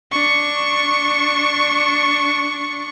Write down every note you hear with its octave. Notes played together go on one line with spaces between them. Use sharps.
D4 C#6